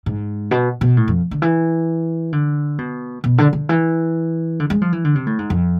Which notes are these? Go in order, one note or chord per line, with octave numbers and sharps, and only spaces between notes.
G#2
B2
B2
A2
F2
D3
E3
D3
B2
B2
D3
D3
E3
D3
G#3
F3
E3
D3
C3
A2
G#2
F2